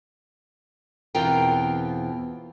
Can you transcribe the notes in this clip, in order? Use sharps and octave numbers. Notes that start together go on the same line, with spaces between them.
E2 B2 C4 F4 A#4 G5